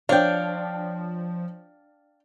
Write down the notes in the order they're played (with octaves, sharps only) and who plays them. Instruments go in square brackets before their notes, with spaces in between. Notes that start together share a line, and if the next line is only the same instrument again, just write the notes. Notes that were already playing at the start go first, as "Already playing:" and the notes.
[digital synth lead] F3 [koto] D4 [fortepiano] C5 C#5 [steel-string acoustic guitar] F5 G5